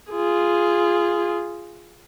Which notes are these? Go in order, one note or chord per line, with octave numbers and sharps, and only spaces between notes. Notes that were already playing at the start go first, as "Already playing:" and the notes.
F4 G#4